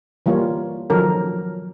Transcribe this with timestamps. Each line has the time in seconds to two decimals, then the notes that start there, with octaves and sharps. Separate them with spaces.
0.26 E3 G3 A#3 F4 C#5
0.90 D#3 F3 F#3 C#4 A4 A#4